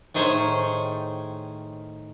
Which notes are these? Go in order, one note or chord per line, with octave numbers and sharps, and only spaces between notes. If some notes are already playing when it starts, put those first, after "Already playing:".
A2 D#3 G#4 C5 C#5